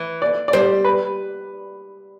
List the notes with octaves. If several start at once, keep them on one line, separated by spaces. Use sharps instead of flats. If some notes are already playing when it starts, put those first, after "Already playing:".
Already playing: E3
D5
D5
G3 C5
B4